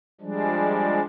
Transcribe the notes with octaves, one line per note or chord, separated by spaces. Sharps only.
F3 G3 G#3 D4